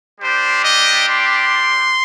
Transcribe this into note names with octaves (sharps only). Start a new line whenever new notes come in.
G3 D4 G4 C5
D#5
C6